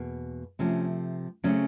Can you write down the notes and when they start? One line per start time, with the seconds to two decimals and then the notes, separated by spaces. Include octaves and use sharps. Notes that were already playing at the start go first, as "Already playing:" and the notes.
Already playing: E2 B2 A#3
0.59 C3 F3 A3 C#4
1.44 C#3 F#3 A3 C4 C#4